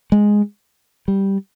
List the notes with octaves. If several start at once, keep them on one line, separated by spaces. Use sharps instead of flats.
G#3
G3